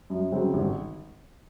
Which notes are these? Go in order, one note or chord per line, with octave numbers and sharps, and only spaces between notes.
F#2
C#3 F#3 C4
G#1